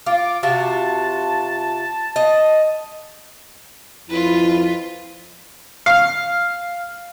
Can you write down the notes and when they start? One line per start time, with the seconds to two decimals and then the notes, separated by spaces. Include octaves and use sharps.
0.06 F4 D6
0.43 C3 F4 F#4 A5
2.16 D#5
4.09 F2 E4 F4 B4
5.86 F5